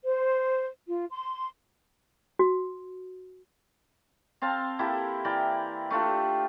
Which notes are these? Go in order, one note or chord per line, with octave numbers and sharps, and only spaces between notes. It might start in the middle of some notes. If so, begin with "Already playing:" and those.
C5
F4
C6
F#4
C4 F5 A5 C6
A#3 E4 G4 A4
E3 A#4 D5 G5
A3 D4 F4 G4